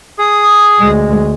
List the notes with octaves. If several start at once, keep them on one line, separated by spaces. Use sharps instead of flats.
G#4 D#6
D2 G#3